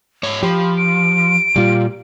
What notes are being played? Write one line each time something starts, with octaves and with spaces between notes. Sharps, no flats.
G#2 C#5
F3 G4 B5
D7
A#2 G3 F4